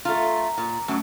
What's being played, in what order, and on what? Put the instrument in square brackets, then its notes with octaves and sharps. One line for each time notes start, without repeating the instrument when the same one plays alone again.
[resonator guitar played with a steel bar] A3 F4 [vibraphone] A#5
[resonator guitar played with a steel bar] A#2
[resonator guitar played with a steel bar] F#2 F#3 [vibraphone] A3